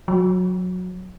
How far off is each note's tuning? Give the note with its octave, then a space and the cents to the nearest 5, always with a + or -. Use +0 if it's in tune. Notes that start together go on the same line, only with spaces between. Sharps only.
F#3 -20